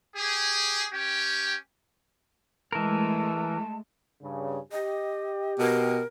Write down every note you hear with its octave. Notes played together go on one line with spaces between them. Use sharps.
G4 G#4
C#4 G4 G5
E3 G#3 A3 A#4 A5
G2 C#3
G4 D#5
B2 A#4